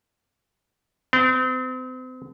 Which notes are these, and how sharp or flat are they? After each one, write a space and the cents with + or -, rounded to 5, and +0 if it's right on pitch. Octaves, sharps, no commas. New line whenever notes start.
C4 -40